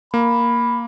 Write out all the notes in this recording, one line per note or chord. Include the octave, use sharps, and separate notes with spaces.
A#3 B5